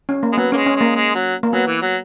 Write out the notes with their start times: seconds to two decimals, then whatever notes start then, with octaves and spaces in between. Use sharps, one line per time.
0.09 C#4
0.23 A#3
0.32 G#3
0.37 F#3 B3
0.52 A#3 C#4
0.57 G#3
0.66 C#4
0.76 G#3 A#3
0.96 G#3
1.15 F#3
1.43 A#3
1.53 F#3 B3
1.67 E3
1.82 F#3